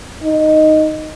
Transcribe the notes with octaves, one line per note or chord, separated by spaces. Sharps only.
D#4